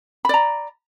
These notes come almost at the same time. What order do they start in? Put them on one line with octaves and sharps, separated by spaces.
B5 D5 A#5